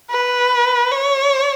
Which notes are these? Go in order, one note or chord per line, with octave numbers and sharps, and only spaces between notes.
B4
C#5